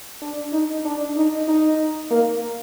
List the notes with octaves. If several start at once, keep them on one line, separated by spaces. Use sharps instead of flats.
D4
D#4
D4
D#4
D#4
A#3